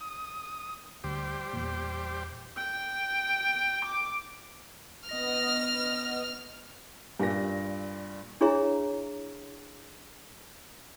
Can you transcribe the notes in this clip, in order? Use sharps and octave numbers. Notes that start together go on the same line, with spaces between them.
D#6
D2 G3 G4 C5
E2 A#2
G5
D6
B3 D#5 F6 A#6
G2 A#2 A#6
D4 E4 G#4 C#5 E5 A#5